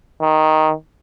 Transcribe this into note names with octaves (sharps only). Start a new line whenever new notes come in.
D#3